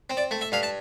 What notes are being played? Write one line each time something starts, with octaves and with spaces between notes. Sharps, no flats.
C4
D5
A3
E5
G2 F5
A5